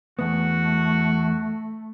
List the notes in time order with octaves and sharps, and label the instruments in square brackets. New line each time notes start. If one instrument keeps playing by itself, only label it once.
[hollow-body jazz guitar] E2 B3 [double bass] A3 [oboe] F#4